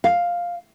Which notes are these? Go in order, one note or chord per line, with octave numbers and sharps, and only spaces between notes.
F5